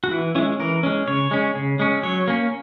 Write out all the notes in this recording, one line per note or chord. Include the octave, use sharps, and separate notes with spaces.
F#4
E3 E4
G#3 C#4 E4
E3 A#4
G#3 C#4
C#3 C#5
G#3 C#4
C#3
G#3 C#4
F#3 C#5
A#3 C#4